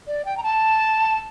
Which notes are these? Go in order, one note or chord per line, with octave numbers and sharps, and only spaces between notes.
D5
G5
A#5
A5